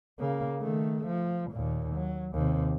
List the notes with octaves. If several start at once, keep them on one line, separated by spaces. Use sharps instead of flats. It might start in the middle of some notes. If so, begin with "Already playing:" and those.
C#3 A#3
D#3 A3
F3
D#2 A#2
F#3
D#2 C3